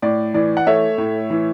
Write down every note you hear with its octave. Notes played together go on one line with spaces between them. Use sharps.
A2 D5
E3 D5
F#5
A3 C#5 E5
A2
E3